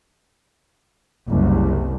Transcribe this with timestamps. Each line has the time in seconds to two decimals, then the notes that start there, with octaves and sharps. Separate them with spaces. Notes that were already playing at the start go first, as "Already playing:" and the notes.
1.27 F#1 C2